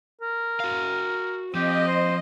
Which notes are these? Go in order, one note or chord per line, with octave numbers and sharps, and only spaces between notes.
A#4
F#4 F5
F3 C4 G4 D#5
C5